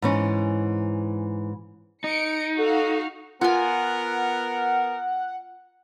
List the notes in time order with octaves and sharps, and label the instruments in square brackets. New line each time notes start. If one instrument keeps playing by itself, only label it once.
[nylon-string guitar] G#2 E3 C#4
[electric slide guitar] D#4 [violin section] C#7 D7
[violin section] F#4 F5 [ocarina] A4
[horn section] B3 A#4 [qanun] F4 G#5 [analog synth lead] F#5